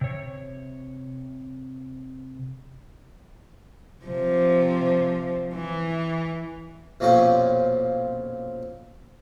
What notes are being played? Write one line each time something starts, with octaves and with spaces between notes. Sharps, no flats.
C3 C#5
C3 F3
E3
B1 F2 A#2 F3 C#4 G4